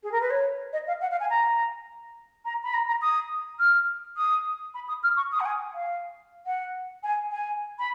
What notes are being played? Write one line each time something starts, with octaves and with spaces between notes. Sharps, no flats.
G#4
A#4
B4
C#5
D#5
F5
F#5
F5
G#5
A#5
A#5
B5
A#5
A#5
D#6
F6
D#6
B5
D#6
F6
C#6
D#6
F#5
G#5
F5
F#5
G#5
G#5
B5